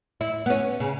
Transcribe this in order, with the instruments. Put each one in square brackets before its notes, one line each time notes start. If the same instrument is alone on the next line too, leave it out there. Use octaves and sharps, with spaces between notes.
[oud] E4
B3
C#4
C#3